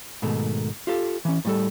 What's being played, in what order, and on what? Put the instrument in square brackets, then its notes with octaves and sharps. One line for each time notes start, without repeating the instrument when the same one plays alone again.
[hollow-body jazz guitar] G#2 B2 D#3 A3
F4 G4 A4
E3 C#4
A2 G3 A4